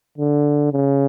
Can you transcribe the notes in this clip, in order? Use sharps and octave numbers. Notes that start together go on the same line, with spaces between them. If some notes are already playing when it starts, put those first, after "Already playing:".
D3
C#3